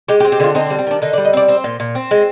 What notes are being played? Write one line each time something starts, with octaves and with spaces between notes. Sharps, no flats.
G#3 G4
G4
C4
G4
D3 F4
C4 D#4
D4
G3
C4
D#3 D4
D3 D#4
D5
G3
D#5
C4 D5
C4 C5
A#2
A#2
C4
G#3